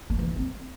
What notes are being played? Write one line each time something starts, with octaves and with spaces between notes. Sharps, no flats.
A#3
E3
G#3
C4